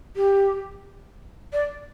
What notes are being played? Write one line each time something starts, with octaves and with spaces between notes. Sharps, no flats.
G4
D5